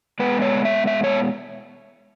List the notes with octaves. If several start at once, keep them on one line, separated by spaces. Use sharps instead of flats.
B2 G#3 B3 B4
C#5
E5
E5
C#5